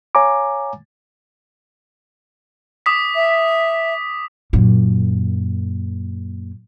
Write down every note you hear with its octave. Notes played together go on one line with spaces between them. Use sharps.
C#5 F5 G#5 A#5 D6
D6 D#6 B6
E5
F#2 A#2